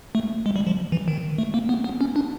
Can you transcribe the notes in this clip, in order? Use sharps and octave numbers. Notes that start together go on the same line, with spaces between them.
A3
G#3
G3
F3
E3
D#3
A3
A#3
B3
B3
C#4
D4